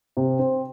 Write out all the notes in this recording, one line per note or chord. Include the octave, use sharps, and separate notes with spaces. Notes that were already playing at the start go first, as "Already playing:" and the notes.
C3
C4